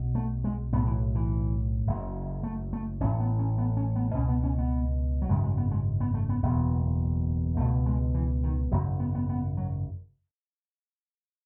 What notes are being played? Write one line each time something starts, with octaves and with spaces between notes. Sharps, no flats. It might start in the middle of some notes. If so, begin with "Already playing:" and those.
Already playing: B1 B2
A3
G#3
B1 A2 B3
E3
E3
F#1 F#2 C#3
A3
A3
A1 A2 C#4
B3
C#4
B3
C#4
B3
C#2 B2 C#4
B3
C#4
B3
F#3
G#1 F#2 C#3 G#3
G#3
B3
G#3
B3
A3
B3
F#1 E2 B2 B3
C#2 B2 A3
G#3
E3
D#3
G#1 F#2 C#3 F#3
B3
B3
B3
F#3